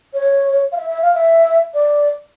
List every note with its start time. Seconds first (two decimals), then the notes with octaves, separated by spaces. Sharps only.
0.13 C#5
0.72 F5
0.77 E5
0.89 E5
1.02 F5
1.14 E5
1.74 D5